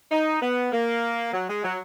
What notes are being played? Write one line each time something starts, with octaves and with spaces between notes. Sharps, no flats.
D#4
B3
A#3
F#3
G#3
F#3